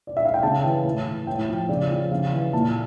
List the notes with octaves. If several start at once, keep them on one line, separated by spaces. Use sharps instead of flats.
D5
E5
F5
G5
C#3 A5
E3
A2
E3
A2 G5
F3
C#3 D5
F3
C#3 F5
E3
A#2 A5